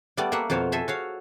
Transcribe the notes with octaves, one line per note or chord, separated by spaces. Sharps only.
G3 A3 B3 D5
A3 A#3 A#4 E5 F#5
F2 B2 F#4 C5 C#5 F5
A4 C5 E5 G#5
F#4 C#5 F5